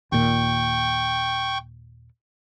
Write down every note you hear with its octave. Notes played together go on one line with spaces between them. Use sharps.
D#2 A#2 G5 C#6